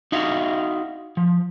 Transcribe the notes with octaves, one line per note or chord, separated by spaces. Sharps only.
D#4 F#4 E5 F5
F3